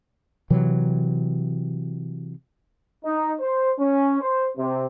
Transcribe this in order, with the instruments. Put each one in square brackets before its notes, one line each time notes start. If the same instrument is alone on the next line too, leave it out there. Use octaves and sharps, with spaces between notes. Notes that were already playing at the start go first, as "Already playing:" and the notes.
[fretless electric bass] C3 E3 F#3
[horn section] D#4
C5
C#4
C5
C3